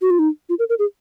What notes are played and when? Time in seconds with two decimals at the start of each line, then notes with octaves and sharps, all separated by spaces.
0.02 F#4
0.10 F4
0.19 D#4
0.49 F4
0.59 A#4
0.69 A#4
0.79 G#4